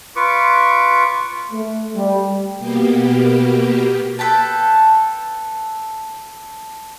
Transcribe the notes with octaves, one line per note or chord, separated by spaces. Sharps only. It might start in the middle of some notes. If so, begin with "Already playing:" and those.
F4 B4 C#6 D6
A3
G3
B2 A#3 B3 G4
A4 B4 G5 A5